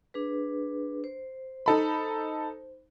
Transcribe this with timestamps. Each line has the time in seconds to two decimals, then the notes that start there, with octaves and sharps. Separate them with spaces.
0.14 D4 G#4 B4
1.04 C5
1.66 D#4 A4 B5